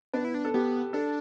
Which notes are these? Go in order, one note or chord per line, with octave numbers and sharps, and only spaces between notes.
B3 D4
E4
D4
A4
B3 G4
D4 A4